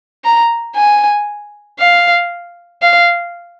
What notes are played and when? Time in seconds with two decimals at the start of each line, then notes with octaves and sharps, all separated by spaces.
0.24 A#5
0.76 G#5
1.79 F5
2.82 F5